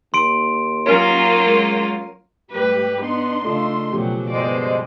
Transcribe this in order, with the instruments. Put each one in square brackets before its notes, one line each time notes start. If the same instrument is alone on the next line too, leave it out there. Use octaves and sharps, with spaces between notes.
[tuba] D#2 [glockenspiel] C6 D7
[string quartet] F#3 A#3 F4 [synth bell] C#4 A#4 C#5
[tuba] G#3
[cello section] G#2 G3 A3 [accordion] G4 [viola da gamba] B4
[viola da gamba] B3 [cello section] D4 D#4 [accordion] C6
[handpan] C#3 F4 A4 [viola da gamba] A3
[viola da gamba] B2 F#3 [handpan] F3 C#4 G4
[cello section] G2 C5 D#5 [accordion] B2 G#3 [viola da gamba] D5